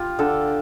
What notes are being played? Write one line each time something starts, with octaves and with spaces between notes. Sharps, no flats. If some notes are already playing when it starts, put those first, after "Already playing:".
Already playing: F4 G4
D3 A4